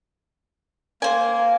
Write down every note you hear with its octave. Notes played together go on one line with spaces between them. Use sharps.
A#3 C5 G#5